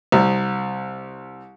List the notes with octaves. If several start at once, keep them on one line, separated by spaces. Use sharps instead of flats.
C2